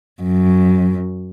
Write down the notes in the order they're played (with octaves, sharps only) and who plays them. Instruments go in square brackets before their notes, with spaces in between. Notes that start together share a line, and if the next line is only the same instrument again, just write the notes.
[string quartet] F#2